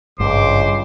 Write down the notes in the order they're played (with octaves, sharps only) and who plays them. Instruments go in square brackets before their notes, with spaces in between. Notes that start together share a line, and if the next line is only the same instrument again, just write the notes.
[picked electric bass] G#1 G2 [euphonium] C#2 [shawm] C5 [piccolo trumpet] D6